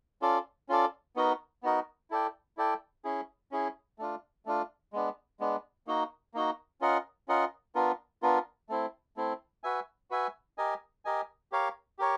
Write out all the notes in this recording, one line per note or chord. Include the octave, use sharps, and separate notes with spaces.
C#4 F4 A4 D5
C#4 F4 A4 D5
B3 D#4 F#4 A#4
B3 D#4 F#4 A#4
E4 A4 D5 G5
E4 A4 D5 G5
C#4 E4 G#4
C#4 E4 G#4
A3 D4 F4
A3 D4 F4
G#3 B3 D4
G#3 B3 D4
A#3 D#4 F#4
A#3 D#4 F#4
C#4 F4 A#4 D#5 F#5
C#4 F4 A#4 D#5 F#5
B3 D4 F4 A#4
B3 D4 F4 A#4
A3 C4 E4
A3 C4 E4
F#4 B4 E5 G#5
F#4 B4 E5 G#5
G4 A#4 D#5 G#5
G4 A#4 D#5 G#5
G4 A#4 C#5 F5
G4 A#4 C#5